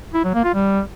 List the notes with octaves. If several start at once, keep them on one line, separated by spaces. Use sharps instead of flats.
E4
F#3
A#3
F4
G3